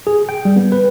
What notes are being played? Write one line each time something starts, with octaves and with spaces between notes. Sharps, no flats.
G#4
G5
G3
B3
B4